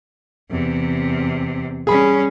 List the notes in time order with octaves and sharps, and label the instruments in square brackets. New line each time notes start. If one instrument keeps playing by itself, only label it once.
[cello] E2 C3
[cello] G3 C#4 [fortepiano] G#4 B5